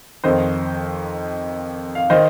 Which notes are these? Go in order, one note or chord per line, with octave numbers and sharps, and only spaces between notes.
F2 D#3 C5 D#5
F5
D#3 C5 D#5